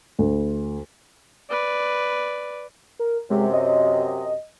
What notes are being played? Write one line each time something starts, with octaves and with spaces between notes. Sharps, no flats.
D2
B4 D5
A#4
F#2 C3 G#3
D#5